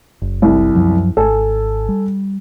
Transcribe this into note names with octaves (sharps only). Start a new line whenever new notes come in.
F#1
C2
F#2 F3 F#3
G#1 A4 G#5
G3